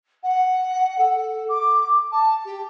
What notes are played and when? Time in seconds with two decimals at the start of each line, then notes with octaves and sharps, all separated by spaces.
0.23 F#5
0.98 A4
1.49 D6
2.12 A5
2.45 G4